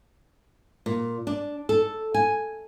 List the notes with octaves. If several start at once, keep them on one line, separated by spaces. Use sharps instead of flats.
A#2
D4
A4
G#5